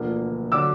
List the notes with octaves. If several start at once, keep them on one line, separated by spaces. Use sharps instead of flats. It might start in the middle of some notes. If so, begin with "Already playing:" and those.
Already playing: E1 D2 D3 F3 A#3
D3 F#3 D6 E6